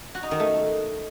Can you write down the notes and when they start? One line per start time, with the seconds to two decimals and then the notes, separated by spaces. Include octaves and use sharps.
0.15 F#4
0.23 D#4
0.31 D#3
0.40 A3